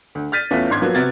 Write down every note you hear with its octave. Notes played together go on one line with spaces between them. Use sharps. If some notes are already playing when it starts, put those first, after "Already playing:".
D2
F6 G6 A6 B6 D#7
E2 E3 A3 B3 C#4 F4
G#1 D4 C6 G#6
F3 F#3 A#3 B3
C3 B3 F#4 F6 G#6 A6